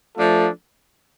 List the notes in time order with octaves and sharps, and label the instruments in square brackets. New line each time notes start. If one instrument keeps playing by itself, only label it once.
[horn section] F3 A3 D4 F4 A4